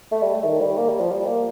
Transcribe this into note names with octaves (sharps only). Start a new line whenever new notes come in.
A3
G3
A3
D#3
G3
A#3
G3
F3
G3
A#3